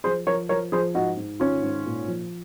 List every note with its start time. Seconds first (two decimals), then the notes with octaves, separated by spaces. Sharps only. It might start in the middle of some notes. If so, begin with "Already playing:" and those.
0.04 F3 G#4 C5
0.27 F3 A#4 C#5
0.49 F3 A#4 C#5
0.72 F3 G#4 C5
0.94 G#2 D#4 F#4
1.17 G#2
1.40 D#3 C#4 F4
1.62 G#2
1.86 A#2
2.08 F3